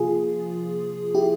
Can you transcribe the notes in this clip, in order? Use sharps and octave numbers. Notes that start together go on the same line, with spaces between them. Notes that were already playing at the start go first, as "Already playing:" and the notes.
Already playing: C3 F3 A#3 F4 G#4
E4 G4